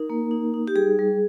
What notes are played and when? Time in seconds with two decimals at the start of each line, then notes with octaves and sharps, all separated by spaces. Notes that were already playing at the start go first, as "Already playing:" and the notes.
Already playing: D#4 A#4
0.10 A#3
0.31 D#4
0.54 D#4
0.68 G4
0.75 G3 G#4
0.99 G3